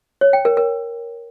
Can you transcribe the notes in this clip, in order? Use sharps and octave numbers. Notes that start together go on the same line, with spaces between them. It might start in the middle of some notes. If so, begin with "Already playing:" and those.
C#5
G5
A#4
A#4